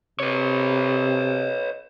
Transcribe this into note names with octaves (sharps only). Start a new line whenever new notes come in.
C3 B4 C#5